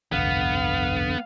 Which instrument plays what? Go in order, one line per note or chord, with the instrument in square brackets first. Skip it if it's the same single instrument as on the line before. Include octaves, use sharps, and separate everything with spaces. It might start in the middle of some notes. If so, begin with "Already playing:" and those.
[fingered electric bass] G1 C2 [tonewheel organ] F2 D3 [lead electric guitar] B3 [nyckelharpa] F5